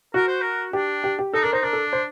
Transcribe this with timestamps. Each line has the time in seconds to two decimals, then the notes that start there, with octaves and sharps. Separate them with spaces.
0.14 F#4 A#4
0.27 C5
0.41 A#4
0.73 D4 G4
1.04 G4
1.19 G4
1.33 D#4 A4
1.43 D4 A#4
1.53 D#4 C5
1.63 D4 A#4
1.73 A4
1.93 C5